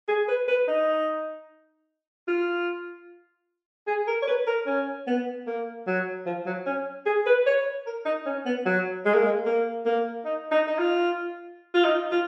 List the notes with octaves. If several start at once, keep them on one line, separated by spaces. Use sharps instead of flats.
G#4
B4
B4
D#4
F4
G#4
A#4
C#5
B4
A#4
C#4
B3
A#3
F#3
F3
F#3
C#4
G#4
B4
C#5
A#4
D#4
C#4
B3
F#3
G#3
A#3
G#3
A#3
A#3
D#4
D#4
D#4
F4
F4
D#4
F4